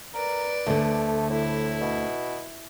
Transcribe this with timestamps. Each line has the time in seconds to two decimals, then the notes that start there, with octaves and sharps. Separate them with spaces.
0.14 A#4 B4 D5
0.66 D2 D3 A3
1.30 A2 E4
1.81 B2